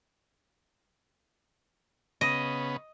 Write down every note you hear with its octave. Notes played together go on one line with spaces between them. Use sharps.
C#3 B3 D#5